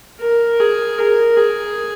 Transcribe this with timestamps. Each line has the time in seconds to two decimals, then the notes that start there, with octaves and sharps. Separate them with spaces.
0.21 A#4
0.60 G#4
0.98 A#4
1.37 G#4